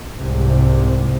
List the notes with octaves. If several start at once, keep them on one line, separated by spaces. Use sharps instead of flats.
C2 G#2 C3